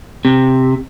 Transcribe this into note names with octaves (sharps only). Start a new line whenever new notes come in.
C3